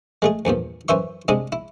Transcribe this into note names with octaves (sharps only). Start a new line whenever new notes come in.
G#3 A3 G#4
E2 G2 A#2 F3
F#2 E3 C5 E5 C#6
C3 G#3 D4 D#6
E4